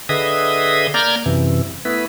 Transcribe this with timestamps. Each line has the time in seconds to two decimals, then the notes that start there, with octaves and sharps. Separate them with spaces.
0.09 D3 G#4 B4 D#5 E5 D#6
0.94 A#3 D5 A#5 F6 G6 G#6
1.26 F#2 C3 E3
1.85 A3 B3 E4 B4